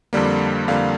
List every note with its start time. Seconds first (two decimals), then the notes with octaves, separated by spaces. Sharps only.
0.13 F2 D3 G3 A#3
0.68 F2 D3 G3 A#3 F5